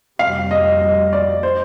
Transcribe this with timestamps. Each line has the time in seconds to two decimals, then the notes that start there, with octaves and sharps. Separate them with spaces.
0.19 F2 C3 G3 F5
0.51 D#5
0.81 D#5
1.13 D5
1.43 C5